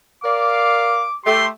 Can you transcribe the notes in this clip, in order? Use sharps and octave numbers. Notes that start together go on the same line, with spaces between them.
A#4 D5 F5 D6
A3 G4 C6